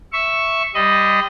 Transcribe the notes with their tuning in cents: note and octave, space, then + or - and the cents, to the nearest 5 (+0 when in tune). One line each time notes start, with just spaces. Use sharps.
E5 +0 C#6 +0
G3 +0 D#5 +0 B5 +45